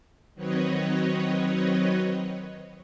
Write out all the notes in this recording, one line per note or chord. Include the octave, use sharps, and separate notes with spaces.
D#3 F#3 C4 B4 C#5 D#5